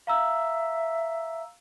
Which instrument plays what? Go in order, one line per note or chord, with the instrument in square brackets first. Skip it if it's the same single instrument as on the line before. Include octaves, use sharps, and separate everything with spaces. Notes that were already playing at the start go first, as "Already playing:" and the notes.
[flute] E5 [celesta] F5 A#5 E6